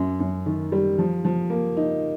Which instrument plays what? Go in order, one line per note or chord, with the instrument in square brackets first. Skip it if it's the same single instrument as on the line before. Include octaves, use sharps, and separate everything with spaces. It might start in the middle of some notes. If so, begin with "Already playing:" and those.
Already playing: [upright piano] F#2
F#2
D#3
G3
F3
F3
A#3
D#4